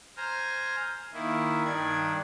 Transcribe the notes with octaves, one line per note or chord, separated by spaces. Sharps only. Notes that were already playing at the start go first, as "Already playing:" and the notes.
C5 G#5 A#5 F6
D#3 A#3 E4
G2 D#3 D4 G#6